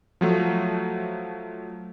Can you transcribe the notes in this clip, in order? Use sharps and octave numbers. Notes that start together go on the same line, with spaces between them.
F3 F#3 A3